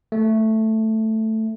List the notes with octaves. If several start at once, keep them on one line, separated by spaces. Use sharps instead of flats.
A3